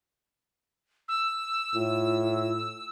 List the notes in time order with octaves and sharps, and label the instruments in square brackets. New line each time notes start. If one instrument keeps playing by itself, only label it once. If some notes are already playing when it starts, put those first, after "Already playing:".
[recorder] E6
[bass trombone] A2 [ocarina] F4